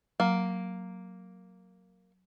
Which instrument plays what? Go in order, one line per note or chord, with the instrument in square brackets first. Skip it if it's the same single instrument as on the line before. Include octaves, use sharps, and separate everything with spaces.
[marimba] F#3 [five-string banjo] A#3